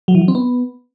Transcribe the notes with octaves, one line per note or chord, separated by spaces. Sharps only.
F#3
E3
F#3
C4
B3